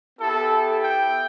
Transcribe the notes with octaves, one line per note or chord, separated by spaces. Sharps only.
B3 E4 G4 A4
G5